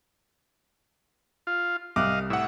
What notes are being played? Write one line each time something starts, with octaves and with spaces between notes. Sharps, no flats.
F4
C2 D#5 F5 D6 F#6
A2 E5 F#5